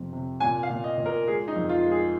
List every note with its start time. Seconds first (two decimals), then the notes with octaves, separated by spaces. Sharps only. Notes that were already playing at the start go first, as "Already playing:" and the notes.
Already playing: F2 C3
0.13 C3
0.40 A#2 G#5
0.63 F5
0.70 A#2
0.84 D#5
0.98 A#2
1.06 A#4
1.27 G#3 G#4
1.48 D#4
1.55 F2
1.69 F4
1.85 G#3
1.92 G#4